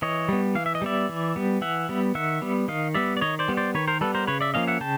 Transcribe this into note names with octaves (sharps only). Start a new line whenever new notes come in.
E3 C#5 D#5
G3 B3
E3 F5
E5
D#5
G3 B3 D5 E5
E3
G3 B3
E3 E5 F#5
G3 B3
D#3 E5 F#5
G3 B3
D#3 D#5 F5
G3 B3 D5 E5
D5
D#3 C#5 D#5
C5 D5
G3 B3
C5 D5
D#3 B4 C#5
A#4 C5
G3 B3 A4 B4
A#4 C5
C#3 B4 C#5
D5 E5
F3 A#3 C#4 D#5 F5
E5 F#5
C#3 G5 A5